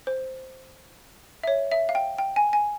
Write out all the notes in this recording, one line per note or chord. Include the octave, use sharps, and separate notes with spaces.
C5
E5
C#5
E5
F5
G5
G5
G#5
G#5